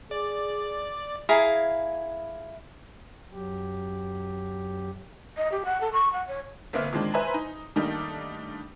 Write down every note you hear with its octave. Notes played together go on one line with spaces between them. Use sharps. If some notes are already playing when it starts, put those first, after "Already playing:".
G#4 D5
E4 G#4 F5 A#5
F#2 F#3 G4
D#5
G4
F#5
A4
C#6
F#5
C#5
G1 A#3 C4 B4 E5 F6
D#3 F3 G#3 C4 D4
B4 C5 E5 G#5 A#5 B5
D#4
D#3 G3 A3 A#3 D4 D#4